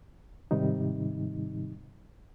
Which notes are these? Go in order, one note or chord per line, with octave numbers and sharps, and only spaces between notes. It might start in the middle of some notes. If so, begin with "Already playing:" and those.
G#2 C3 D#3 G3 D#4